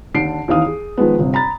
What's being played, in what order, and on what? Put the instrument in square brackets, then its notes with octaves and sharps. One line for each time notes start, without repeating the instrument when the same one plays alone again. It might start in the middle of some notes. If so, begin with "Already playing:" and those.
[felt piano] D#2 D3 D4 C7 D7
D#2 E3 D#4 F5 D#6
G#4
D#3 F3 G#3 B3
G1 C3
A#5 B5 A6